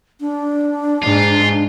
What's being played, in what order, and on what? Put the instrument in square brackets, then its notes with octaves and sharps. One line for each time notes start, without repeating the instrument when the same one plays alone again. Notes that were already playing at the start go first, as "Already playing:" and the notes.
[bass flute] D4
[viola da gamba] G#2 [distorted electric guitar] F4